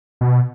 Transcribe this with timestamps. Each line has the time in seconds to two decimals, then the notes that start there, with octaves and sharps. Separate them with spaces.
0.21 B2